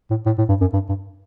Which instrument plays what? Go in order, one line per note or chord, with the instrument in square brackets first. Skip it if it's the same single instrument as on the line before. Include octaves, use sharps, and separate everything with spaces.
[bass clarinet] A2
A2
A2
G2
F#2
G2
G2